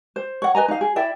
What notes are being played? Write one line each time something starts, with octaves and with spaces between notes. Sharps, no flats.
C5
C#5 F#5
B4 D#5 G#5 A#5
D#4 F5
G#4
E4 D5 E5 G5